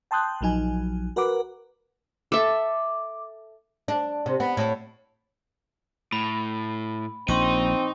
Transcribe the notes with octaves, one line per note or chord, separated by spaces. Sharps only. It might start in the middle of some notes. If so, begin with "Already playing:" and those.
G5 A5 C6 D#6 F#6 G6
A#1 F3 F#3 D#4 G#5
F#4 A#4 B4 F#5 D6
A4 E5 D6
D4
C3
B3
A2
A2 B5
A#1 C4 D#4 C6 C#6 D#7